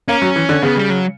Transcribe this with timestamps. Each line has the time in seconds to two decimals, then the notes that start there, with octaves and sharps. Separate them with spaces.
0.08 A#3 C#4
0.22 F#3
0.36 E3
0.49 D3
0.63 C#3 B3
0.76 G3
0.90 F#3